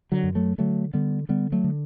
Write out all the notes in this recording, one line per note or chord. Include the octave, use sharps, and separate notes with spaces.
D3 F#3
F#2
F#3 A3
D3 F#3 A3
D3 G3 B3
D3 G3 B3
F#3 A3
D3